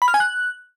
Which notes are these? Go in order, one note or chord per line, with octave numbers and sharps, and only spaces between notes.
B5
F6
G#5
F#6